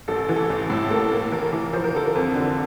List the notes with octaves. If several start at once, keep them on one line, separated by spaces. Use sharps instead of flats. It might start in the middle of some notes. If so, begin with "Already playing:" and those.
A1 A4
E3
A4
A1
A2
A#3 A4
A#3
E3 A#4
E3
F3 C5
A#4
D3 A4
A#4
F2
D3